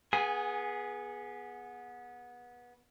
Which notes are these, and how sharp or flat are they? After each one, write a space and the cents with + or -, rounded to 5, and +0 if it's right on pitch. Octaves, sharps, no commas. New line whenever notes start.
B3 -20 G#4 +0 G#5 -20